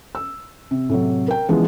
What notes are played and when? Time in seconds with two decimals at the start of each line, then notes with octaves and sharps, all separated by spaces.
0.15 E6
0.71 C3
0.89 A2 C3 F#3
1.28 A#4 G5
1.49 C#3 E3 F3 G#3 B3